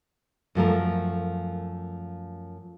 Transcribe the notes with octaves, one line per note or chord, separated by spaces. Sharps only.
F#2 F3 A3 A#4